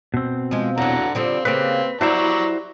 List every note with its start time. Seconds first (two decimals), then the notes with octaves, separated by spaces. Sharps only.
0.14 B2 C4
0.51 F3 G#3
0.78 E2 D3 F#3 F#5 A#5
1.15 D3 F3 G3 C4
1.45 C#3 A#3 C4 G4 B4
2.01 F#3 G3 E4 F#4 C5 D5 E5 A#5